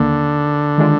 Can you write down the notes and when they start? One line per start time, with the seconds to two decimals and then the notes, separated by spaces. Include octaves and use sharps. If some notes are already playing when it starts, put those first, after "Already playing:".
Already playing: D#2 D3 D#3 A#3
0.78 D#3 G#3 D4 F4